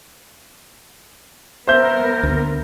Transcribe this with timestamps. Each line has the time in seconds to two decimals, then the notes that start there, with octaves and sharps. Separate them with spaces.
1.67 B3 A#4 C5 E5 G6
2.23 D2